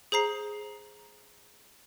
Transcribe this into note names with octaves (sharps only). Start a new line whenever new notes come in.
G#4 C5 A#5 C7